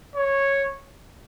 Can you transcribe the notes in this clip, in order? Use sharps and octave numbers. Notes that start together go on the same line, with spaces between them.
C#5